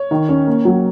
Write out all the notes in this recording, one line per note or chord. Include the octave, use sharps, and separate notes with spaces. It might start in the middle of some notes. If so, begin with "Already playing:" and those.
Already playing: C#5
D#3
C#4
A#3
F#3